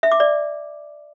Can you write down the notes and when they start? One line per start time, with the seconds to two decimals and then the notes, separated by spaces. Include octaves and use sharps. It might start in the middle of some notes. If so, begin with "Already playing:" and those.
0.03 E5
0.12 D6
0.20 D5